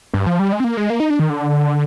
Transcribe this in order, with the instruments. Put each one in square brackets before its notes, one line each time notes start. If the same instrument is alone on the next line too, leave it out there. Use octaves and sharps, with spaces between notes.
[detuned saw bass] G2
F3
G3
G#3
C4
A#3
G#3
A#3
D#4
D4
D#3
D3